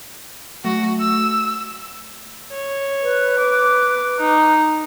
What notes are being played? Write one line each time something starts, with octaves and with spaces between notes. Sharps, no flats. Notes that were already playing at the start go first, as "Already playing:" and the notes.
F#3 A3 F#4
E6
C#5
B4
D6
D#4